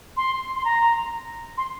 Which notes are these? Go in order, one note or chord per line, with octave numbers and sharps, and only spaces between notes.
C6
C6
A#5
C6